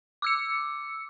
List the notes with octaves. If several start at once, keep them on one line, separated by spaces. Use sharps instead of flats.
D6 E6 C#7